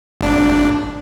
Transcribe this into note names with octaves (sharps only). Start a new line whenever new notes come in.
G#1 D4